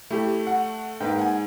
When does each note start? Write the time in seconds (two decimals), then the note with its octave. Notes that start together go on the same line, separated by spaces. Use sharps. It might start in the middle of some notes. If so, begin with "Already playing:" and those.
0.11 A3 E4 G4
0.47 F#5
1.00 G#2 A#3 B4 G5
1.19 F#5 G#5